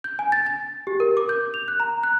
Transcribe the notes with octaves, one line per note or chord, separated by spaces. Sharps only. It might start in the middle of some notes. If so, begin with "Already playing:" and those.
G6
G#5
A6
A6
G4
A#4
D6
G6
F7
F#6
A#5
F#6